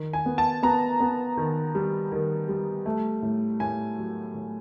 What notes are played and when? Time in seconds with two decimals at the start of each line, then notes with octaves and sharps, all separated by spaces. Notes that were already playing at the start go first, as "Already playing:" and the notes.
Already playing: D#3
0.13 G#5
0.26 B3
0.38 A5
0.63 B3 A#5
1.00 B3
1.37 D#3
1.75 G3
2.12 D#3
2.48 G3
2.86 A3
3.22 A2
3.60 A2 G#5
3.97 F#3
4.34 A2